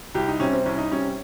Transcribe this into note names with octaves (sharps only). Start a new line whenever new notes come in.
C2 G4
D#4
C3 G3 C#4
C4
C2 C#4
D#4
C3 G3 C#4